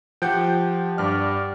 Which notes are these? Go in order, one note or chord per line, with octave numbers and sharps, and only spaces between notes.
F3 G4 F#5 G5 G6
G2 D5 F6